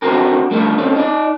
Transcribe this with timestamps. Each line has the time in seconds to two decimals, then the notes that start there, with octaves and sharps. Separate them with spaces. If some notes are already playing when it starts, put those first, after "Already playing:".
0.02 C4 D4 F#4 G4 A4 A#4
0.51 G3 A3 D4 F4 A4
0.78 C4 C#4 A4
0.95 D#4 D5